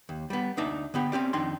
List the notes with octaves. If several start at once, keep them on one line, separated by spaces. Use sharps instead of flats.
D#2
G3 B3
D2 D4 D#4 E5 A5
D3 B3 G4
C4 C#4 G4 D5
F2 D#3 D4 D#4 C6